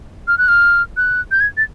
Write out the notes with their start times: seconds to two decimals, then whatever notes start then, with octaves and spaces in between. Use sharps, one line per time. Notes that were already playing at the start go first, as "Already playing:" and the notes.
0.27 F6
0.38 F#6
0.48 F6
0.97 F#6
1.31 G6
1.40 G#6
1.57 A6